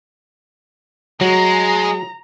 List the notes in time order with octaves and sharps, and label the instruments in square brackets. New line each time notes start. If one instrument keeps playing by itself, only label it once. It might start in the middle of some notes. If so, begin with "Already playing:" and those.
[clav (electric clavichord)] F#3 [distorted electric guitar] G#3 [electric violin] A#5